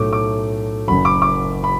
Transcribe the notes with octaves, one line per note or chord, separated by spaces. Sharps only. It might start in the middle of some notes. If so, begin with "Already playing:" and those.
Already playing: B1 A2 A3 D6
D6
F#1 F#2 F#3 B5
D6
D6
B5